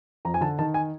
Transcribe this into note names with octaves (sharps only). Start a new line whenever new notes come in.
F2 A#5
G#5
D3 A5
D#3 A5
G#5